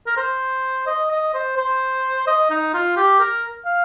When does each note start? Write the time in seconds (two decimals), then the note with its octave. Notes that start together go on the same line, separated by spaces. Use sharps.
0.07 A#4
0.17 C5
0.87 D#5
1.11 D#5
1.34 C5
1.57 C5
2.27 D#5
2.50 D#4
2.74 F4
2.97 G4
3.20 A#4
3.66 F5